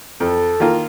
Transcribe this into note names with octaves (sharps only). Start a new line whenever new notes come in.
F2 A4
D#3 A#3 F4